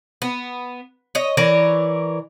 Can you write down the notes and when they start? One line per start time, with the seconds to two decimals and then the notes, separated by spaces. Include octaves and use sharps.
0.22 B3
1.15 C#5 D#5
1.37 E3 A#4 C#5 D5